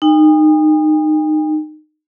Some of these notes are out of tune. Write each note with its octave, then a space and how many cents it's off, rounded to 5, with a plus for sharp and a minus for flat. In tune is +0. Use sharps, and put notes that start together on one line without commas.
D#4 -20 G5 +45